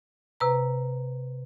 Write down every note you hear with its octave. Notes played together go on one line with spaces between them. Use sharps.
C3 B4 A#5